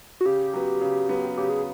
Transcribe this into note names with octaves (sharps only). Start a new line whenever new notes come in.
F#4
C#3 G4
F#3 B3
C#3
F#3 B3
C#3 G4
G#4